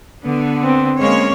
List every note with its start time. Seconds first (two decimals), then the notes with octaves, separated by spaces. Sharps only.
0.24 D3 B3
0.64 C4
1.00 G#3 A#3 C#4 C#5